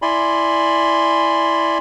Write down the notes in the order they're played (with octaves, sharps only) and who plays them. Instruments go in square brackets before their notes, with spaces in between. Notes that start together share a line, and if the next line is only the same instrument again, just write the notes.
[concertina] E4 D5 G#5 B5 C6